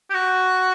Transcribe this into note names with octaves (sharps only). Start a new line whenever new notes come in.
G4
F#4